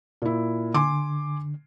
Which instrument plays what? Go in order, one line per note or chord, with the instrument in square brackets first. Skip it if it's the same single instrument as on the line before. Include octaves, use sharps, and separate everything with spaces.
[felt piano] A#2 E4
[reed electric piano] D3 [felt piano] G#5 C6 D6